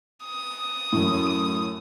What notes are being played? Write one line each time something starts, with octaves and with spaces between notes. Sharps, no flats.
D#6
F#2 A2